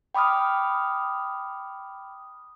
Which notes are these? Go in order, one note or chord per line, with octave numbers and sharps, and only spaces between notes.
G5 B5 D6 D#6 F6